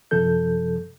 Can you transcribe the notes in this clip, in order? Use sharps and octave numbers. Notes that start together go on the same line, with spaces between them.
F#2 C3 F3 A4 G6